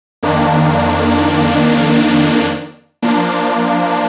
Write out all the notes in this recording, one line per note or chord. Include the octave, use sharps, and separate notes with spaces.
F2 D#3 A#3 D4
F3 A#3 D4